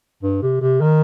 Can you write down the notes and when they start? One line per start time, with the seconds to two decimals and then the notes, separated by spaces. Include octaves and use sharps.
0.23 G2
0.43 C3
0.61 C3
0.81 D#3